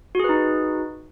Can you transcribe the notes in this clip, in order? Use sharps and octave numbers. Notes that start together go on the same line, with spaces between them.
D#4 F#4 G#4 B4